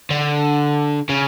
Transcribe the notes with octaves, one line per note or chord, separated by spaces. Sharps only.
D3
C#3